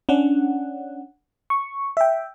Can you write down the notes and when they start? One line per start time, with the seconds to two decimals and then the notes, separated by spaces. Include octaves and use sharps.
0.09 C#4 D4 F#5
1.50 C#6
1.97 E5 G5